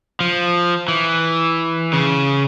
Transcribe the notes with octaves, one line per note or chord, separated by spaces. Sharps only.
F3
E3
C#3